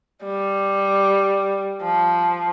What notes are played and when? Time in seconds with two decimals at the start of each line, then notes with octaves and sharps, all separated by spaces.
0.25 G3
1.82 F3